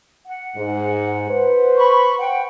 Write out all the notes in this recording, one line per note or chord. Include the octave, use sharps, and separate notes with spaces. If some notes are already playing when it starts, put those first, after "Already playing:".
F#5
G#2
B4 C5
B5 C#6
F#5 G5